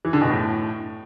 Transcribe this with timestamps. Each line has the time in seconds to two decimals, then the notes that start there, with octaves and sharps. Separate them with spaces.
0.05 E3
0.13 D3
0.22 B2
0.30 A2